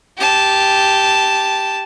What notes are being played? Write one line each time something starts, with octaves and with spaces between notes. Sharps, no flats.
G4 A5